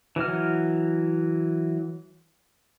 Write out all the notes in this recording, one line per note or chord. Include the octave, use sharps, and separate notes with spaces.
E3 F#3 F#5 F6